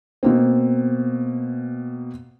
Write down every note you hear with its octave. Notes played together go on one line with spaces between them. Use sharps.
B2 A#3 C4